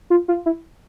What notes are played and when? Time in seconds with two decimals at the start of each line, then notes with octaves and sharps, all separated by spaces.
0.10 F4
0.28 F4
0.46 E4